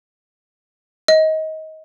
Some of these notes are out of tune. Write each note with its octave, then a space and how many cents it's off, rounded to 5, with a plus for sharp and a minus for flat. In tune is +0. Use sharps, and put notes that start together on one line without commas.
D#5 +20